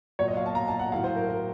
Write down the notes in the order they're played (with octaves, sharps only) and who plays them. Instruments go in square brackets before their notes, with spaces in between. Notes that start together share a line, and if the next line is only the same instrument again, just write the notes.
[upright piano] A#2 F#3 C#5
D#5
F5
A5
A#5
A5
F#5
A2 F#3 F5
C5
A#4
A#4